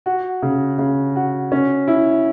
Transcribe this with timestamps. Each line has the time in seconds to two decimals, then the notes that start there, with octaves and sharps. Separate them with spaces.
0.06 F#4
0.42 C#3
0.79 C#3
1.16 F#4
1.52 C#4
1.88 E4